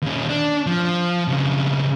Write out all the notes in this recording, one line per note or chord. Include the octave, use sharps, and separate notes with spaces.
D#2 C#4
D4
F3
B1 C#3